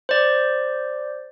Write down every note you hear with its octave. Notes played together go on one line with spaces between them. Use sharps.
C5 D5